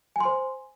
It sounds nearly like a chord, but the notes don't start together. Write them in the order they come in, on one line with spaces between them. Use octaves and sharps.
G#5 C6 C5